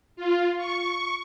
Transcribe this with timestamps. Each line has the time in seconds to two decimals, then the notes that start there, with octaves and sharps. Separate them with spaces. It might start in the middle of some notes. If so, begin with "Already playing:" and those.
0.16 F4
0.57 C#6